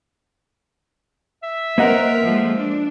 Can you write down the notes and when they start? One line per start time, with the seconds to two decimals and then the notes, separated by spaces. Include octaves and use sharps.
1.43 E5
1.78 A#3 C4 A#4 B4 D#5 F#5
2.24 F3 G#3 A3
2.57 D4